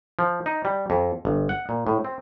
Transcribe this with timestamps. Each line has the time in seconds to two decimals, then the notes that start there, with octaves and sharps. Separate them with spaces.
0.19 F3
0.46 D#4
0.65 G3
0.90 F2
1.25 G1
1.49 F#5
1.69 A#2
1.87 A2
2.04 C4